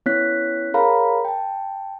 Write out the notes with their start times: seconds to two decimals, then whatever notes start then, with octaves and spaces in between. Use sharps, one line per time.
0.06 B3 C#4 E4 C#5 F#6 B6
0.74 G#4 A#4 C#5 F5 A#5 B5
1.25 G5 A5